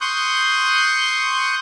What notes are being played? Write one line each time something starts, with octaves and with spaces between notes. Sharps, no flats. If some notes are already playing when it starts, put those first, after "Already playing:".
C6 C#6 D#6 F#6 G6